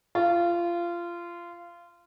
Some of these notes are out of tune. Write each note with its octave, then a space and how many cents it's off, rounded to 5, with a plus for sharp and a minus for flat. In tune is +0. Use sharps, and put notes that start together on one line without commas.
F4 -20